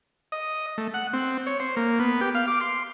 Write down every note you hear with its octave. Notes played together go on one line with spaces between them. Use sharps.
D#5
A3
F#5
C4
C#5
C5
A#3
B3
G4
F5
D6
C6